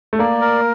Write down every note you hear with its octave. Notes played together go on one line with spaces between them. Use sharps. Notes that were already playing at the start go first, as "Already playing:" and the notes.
A3
A#3 D5
A#4